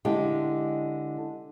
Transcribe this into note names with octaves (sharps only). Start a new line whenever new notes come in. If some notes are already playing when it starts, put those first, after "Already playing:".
D3 G#3 E4 G4 G5